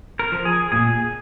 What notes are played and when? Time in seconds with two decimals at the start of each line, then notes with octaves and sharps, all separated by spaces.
0.19 A#4
0.32 F3
0.45 G#4
0.72 A#2 G#4